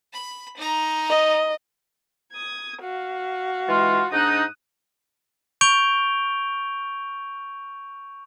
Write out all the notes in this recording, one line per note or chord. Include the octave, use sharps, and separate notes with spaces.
B5
D#4 A#5
D#5
D#6 G#6
F#4 F5
E3 G#3 F4
G#2 D4 D#4 D#6 F#6
C#6 G6 D7 F7 G7